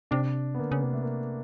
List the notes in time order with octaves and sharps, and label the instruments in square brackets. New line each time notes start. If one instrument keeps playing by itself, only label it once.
[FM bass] C3 [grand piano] D4
[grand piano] B3
[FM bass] D3 [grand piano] A#3
[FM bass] C#3
[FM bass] C3 [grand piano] A#3
[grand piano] A3
A#3